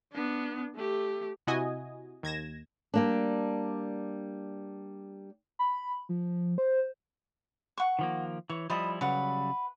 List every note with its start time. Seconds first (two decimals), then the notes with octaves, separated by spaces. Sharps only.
0.12 B3 D4
0.75 A3 G4
1.47 C3 E4 F#4 D#5 G#5 D#6
2.23 D#2 G#6 A#6 E7
2.94 G3 A#3 D4
5.59 B5
6.09 F3
6.58 C5
7.78 F#5 C#6
7.99 D#3 F3 A#3
8.50 E3 C#5
8.70 F3 G3 E4 D#5 B5 D#6
9.01 C#3 F#3 G3 B4 F#5